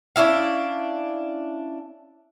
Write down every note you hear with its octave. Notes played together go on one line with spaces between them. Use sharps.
C#4 D4 E4 F5